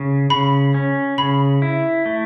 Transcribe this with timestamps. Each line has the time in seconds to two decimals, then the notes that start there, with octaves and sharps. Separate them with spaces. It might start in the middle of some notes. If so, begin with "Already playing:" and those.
Already playing: C#3
0.30 C#3 B5
0.74 C#4
1.18 C#3 B5
1.62 E4
2.06 A3